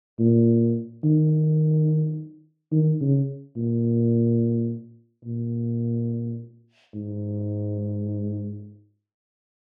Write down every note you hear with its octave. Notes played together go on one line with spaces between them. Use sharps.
A#2
D#3
D#3
C#3
A#2
A#2
G#2